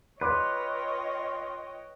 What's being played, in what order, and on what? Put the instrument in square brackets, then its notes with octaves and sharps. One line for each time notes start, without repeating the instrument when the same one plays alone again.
[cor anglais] F4 [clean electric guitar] B4 [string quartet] C#5 D#5 G5 [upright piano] C6 D6